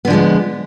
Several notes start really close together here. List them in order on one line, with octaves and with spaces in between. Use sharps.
B3 D3 F3 G#3